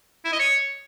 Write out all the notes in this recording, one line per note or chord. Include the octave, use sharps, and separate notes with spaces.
E4
D#5
C#5